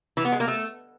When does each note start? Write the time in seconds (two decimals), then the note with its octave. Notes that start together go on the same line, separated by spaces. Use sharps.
0.17 E3
0.25 B3
0.32 G#3
0.40 A#3
0.48 A3